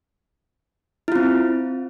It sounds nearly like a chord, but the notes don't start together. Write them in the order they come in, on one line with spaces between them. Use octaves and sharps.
E4 F4 C4